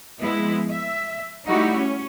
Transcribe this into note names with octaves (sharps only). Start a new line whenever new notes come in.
F3 G#3 B3 E4
E5
G3 A3 D#4 E4 F#4 G4
C#4